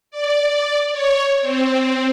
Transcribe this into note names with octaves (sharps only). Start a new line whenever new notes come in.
D5
C#5
C4